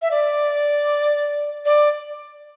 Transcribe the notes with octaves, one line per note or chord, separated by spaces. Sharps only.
E5
D5
D5